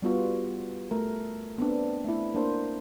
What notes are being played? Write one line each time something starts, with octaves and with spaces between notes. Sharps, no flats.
G3 B3 F4 F#4
A3 A#4
B3 C4 D4
A3 E4
A#3 D4 C5